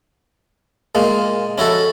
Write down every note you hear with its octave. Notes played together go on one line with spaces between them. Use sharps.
A#2 G#3 A#3
C#4 E4 F#4 A4